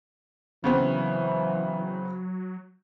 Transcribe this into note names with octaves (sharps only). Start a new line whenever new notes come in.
C#3 E3 F#3 B3 C4